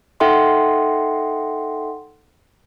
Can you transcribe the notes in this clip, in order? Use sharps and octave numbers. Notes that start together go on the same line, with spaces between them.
D#4 A4 E5 F#5 G5 C6